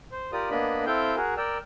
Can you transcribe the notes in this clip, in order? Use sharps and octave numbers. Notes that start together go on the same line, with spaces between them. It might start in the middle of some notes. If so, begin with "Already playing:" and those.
C5
F4 G4 A#4 D5 D#6
A#3 B3 D4 D#5 B5
C4 E4 A4 F5 G5 G6
F#4 G#4 A#4
A#4 D5 G5 E6